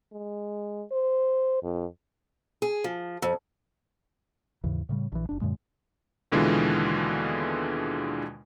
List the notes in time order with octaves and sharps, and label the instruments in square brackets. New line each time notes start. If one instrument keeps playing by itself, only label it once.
[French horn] G#3
C5
F2
[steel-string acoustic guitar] G#4
F3
F2
[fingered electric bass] D#2 G#2 C#3 E3
A2 C#3 G3
A#1 E3
F#1 D4
F#2 A#2 D3 G#3
[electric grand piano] D#2 B2 D3 E3 G#3 F4